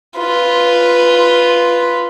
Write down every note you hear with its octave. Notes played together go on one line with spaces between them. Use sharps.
F4 B4